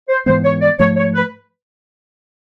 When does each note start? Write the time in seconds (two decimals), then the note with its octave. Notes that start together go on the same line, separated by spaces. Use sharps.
0.08 C5
0.26 G#2 E3 G#3 B3 C5
0.44 C#5
0.61 D5
0.79 G#2 F3 A3 C#5
0.96 C#5
1.15 B4